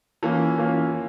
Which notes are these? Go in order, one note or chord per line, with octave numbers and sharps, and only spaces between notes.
E3 A#3 C#4 F4
E3 A#3 C#4 F4